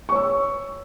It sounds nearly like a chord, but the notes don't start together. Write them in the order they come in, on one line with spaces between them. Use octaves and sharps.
C#6 C#5 E6